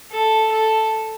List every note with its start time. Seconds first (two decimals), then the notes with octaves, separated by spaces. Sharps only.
0.11 A4
0.52 A4